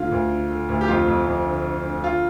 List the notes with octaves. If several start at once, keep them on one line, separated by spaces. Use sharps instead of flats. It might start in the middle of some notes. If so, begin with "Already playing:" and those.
Already playing: D2 D3 F4
D2
D3
D3
D2
G4
F2 F4
F2
F2
D3
D3
D3
D3 F4